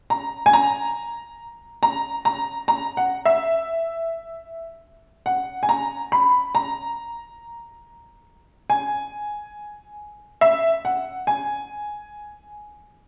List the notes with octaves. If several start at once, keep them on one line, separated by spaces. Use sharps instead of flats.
A#5
G#5
A#5
A#5
A#5
A#5
F#5
E5
F#5
G#5
A#5
B5
A#5
G#5
E5
F#5
G#5